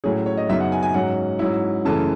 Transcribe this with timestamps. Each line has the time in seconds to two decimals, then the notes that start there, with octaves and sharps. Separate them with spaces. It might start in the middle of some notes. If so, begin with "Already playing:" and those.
0.04 A2 F#3 C#4 G#4
0.26 C#5
0.37 D#5
0.49 F#2 C#3 F#3 B3 D#4 E5
0.60 F#5
0.72 G#5
0.83 G#5
0.94 G#2 F#3 C#4 F#5
1.39 G#2 F#3 C#4 E4
1.85 F#2 C#3 E3 A3 A5